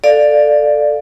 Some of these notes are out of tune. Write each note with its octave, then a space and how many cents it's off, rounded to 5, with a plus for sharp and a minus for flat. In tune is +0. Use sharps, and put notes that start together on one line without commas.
A4 +5 D5 +10 F5 +0